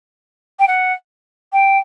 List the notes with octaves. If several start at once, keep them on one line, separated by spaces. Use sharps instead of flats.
G5
F#5
G5